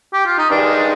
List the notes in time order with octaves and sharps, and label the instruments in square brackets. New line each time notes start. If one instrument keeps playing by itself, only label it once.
[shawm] G4
F4
D#4
[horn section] G2 D#3 G#3 [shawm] D4